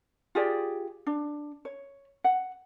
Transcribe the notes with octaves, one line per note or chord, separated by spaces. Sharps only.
F4 G4 G#4 D5
D4
C#5
F#5